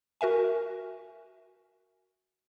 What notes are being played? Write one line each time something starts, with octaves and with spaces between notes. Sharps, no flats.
F#4 A#4 E5 G#5